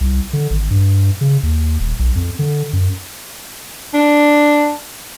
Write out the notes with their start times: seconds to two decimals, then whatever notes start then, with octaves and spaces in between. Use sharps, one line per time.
0.01 C2
0.33 D3
0.50 G#1
0.70 G2
1.21 C#3
1.43 D#2
1.80 D#1
1.99 B1
2.15 F2
2.39 D3
2.73 F#2
3.94 D4